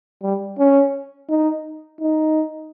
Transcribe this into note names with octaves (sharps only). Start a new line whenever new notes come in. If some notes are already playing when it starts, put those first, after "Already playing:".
G3
C#4
D#4
D#4